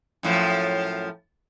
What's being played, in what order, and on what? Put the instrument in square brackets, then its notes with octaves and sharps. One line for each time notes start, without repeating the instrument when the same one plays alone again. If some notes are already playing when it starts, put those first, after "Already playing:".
[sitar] F#2 A2 F3